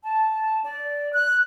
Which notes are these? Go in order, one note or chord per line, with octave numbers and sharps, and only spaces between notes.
A5
D5
F#6